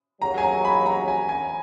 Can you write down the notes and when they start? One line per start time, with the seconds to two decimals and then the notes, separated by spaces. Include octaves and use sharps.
0.21 D#2 C#3 F#3 A#5
0.38 G#5
0.43 A#5
0.65 B5
0.86 A#5
1.08 G#5
1.29 G#5